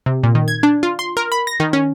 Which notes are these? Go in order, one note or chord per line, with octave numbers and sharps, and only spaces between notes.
C3
A#2
D#3
G#6
D4
F4
C6
A#4
B5
A#6
D#3
C#4